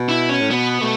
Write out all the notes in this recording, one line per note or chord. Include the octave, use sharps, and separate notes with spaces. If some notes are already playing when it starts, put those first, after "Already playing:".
Already playing: B2
E4
C#4
A2
B2 B3
B2 A3